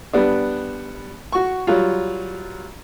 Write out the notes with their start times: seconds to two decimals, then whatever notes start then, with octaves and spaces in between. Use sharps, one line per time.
0.13 G3 B3 D4
1.33 F#4 C#6
1.67 F#3 G3 F4